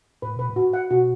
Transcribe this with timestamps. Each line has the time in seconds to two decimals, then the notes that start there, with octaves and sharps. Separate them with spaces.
0.22 A2 B4
0.36 B2 B4
0.49 A2
0.56 F#4
0.73 F#5
0.90 B2 F#4